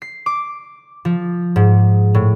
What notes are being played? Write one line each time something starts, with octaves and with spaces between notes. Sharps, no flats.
C7
D6
F3
G#2
A2